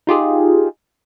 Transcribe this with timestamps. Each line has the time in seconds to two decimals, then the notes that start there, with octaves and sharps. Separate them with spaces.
0.07 D#4 F4 G4 G#4